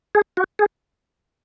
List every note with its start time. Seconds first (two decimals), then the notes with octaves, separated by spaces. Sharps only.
0.15 G#4
0.37 F#4
0.59 G#4